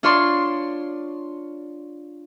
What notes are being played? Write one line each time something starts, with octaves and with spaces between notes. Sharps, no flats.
D4 F4 C#5 D5 C6